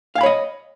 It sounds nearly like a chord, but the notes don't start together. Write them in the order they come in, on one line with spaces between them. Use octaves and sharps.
F5 G#5 B5 C#5 D#5